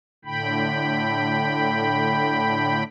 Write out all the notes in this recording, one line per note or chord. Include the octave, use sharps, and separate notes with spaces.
A2 D3 G5 B5